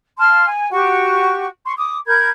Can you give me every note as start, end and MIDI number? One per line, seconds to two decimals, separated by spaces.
0.18 0.46 77
0.18 0.46 81
0.18 0.46 84
0.18 0.46 89
0.46 0.68 80
0.71 1.46 66
0.71 1.46 67
0.71 1.46 85
1.65 1.73 84
1.65 1.73 85
1.77 1.99 86
1.77 1.99 87
2.06 2.29 70
2.06 2.29 83
2.06 2.29 91
2.06 2.29 92